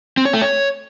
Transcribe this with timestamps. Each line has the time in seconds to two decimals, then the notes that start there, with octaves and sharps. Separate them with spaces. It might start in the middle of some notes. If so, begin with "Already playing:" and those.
0.17 C4
0.25 C#5
0.33 A3
0.41 C#5